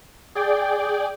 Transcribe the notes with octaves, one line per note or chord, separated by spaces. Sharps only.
G#4 D5 G5